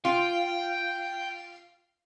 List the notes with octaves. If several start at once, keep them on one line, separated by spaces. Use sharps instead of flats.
F4 G5